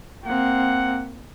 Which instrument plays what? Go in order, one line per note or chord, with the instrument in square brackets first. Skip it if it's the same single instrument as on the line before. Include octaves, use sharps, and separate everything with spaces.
[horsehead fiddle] A#3 C4 [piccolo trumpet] F#5